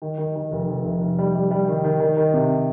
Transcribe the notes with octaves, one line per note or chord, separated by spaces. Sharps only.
D#3
D#3
D#3
F1
F1
F1
F1
G3
G3
G3
D#3
D#3
D#3
D#3
C3